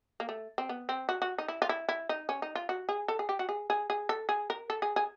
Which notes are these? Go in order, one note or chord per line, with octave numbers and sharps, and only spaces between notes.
A#3
A3
C4
B3
C4
F#4
F#4
D#4
E4
F4
E4
E4
D#4
C#4
D#4
F4
F#4
G#4
A4
G#4
G4
F#4
G#4
G#4
G#4
A4
G#4
A#4
A4
G#4
G#4